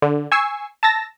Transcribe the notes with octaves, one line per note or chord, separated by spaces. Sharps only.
D3
G#5 C#6 E6 C7
A5 E6 A6 A#6